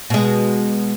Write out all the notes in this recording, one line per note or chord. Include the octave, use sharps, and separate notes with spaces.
B2 G#3